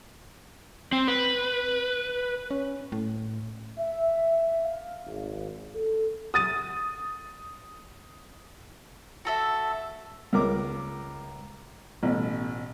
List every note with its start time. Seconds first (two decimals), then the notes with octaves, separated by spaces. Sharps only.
0.92 C4
1.08 B4
2.51 C#4
2.92 A2
3.78 E5
4.65 F5
5.06 G#1
5.74 A4
6.34 D#6 A6 D#7
9.25 F#4 A4 E5
10.33 C#2 A#4 D6
12.03 A1 B2